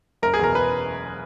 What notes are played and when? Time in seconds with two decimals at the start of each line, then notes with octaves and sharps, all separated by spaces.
0.22 F#1 A#4
0.34 G#4
0.39 E2 B2 A#4
0.55 B4